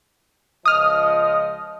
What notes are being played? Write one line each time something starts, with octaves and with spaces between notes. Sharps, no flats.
C#2 F3 D#5 D#6 F6